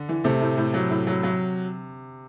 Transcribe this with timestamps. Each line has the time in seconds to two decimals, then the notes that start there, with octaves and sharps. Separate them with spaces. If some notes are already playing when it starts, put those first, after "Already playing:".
Already playing: D3
0.09 E3
0.24 C3 A3
0.41 A2
0.57 A2
0.74 F#3
0.90 A2
1.07 F#3
1.23 F#3